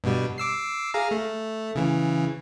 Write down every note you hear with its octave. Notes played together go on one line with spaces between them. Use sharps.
G2 B2 G3
D6 E6 C7
G#4 F5 A#5
A3
C#3 E3